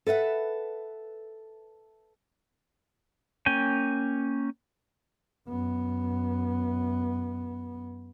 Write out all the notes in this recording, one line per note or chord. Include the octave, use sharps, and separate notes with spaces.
A4 B4 E5 F#5
A#3 C#4 G5 G#5
F#2 B3